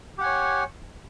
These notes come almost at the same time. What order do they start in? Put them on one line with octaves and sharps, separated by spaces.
G4 F#5 G#5 C#5